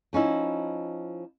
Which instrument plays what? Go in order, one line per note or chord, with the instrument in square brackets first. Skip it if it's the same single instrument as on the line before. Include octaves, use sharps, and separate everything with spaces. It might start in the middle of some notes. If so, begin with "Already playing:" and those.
[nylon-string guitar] F3 C#4 D#4 E4